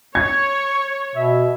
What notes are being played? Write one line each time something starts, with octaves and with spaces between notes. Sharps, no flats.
C#5 G#6
B2 E5